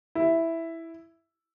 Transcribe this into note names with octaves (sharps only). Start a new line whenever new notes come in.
E4